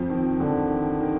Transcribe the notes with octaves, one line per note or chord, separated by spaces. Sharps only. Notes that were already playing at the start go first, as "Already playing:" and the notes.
Already playing: F2 F3
D#3
D3
D#3
D#3